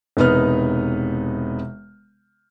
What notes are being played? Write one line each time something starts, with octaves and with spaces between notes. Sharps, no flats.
E1 C3 B3 D#4 B4 F6